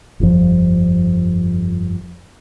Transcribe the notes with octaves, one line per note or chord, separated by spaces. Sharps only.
G1 F2 B2 F3